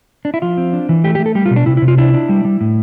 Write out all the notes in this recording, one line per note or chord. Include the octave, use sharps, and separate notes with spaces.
D4
E4
F3 F4
C4
D4
E3
A3 G4
G4
A3
A4
G3 G4
F4
B2
D4
C3 E4
E4
C3
F4
D4 E4
D4
G3
G3
A2